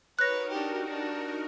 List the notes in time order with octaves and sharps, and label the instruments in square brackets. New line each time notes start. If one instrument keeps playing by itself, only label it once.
[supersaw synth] D#4 F#4 A#4 [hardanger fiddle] B4 C#5 [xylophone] F#6 A#6
[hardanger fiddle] D4 G4
D4